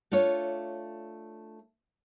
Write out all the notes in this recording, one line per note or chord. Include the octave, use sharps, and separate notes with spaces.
A3 D4 F4 C#5